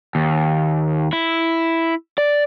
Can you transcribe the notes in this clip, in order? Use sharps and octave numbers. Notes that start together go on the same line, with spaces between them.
D#2
E4
D5